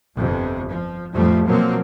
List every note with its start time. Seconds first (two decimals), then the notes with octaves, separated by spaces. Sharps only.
0.17 G1 F2 C3
0.69 F3
1.15 F2 A2 F3 G3 A3
1.46 B2 F3 F#3 A#3 C4